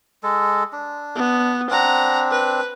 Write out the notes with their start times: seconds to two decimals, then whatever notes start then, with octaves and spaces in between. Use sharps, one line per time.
0.23 G#3 A4
0.73 D4
1.16 B3
1.70 C4 D4 F#5 A#5
2.31 B4